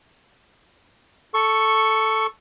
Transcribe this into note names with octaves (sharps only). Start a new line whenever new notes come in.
A4 C#6